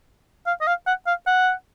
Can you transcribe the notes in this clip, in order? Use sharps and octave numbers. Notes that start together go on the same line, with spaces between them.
F5
D#5
F5
F#5
F5
F#5